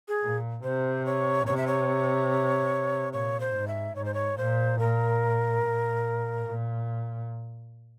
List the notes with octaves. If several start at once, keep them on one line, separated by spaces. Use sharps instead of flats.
G#4
A#2
C3 C5
C#5
C3 C#5
E5
C#5
A#2 C#5
C5
G#2
E5
G#2 C#5
C5
C#5
A#2 C5
A#2 A#4
A#2
A#2